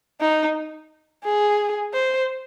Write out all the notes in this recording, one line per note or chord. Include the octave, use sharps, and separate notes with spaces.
D#4
G#4
C5